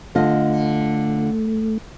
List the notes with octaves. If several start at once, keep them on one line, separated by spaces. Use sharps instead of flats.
D3 A3 F4 D#5